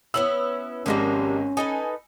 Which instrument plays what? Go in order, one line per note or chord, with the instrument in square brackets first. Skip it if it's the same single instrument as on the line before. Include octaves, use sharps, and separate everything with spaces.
[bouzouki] B3 C#4 E4 [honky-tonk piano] E6 F#7
[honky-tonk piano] G#1 G#3 A#6 [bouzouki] F3 G3 A#3 [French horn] C#4
[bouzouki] D#4 A4 B4 [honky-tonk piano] G#5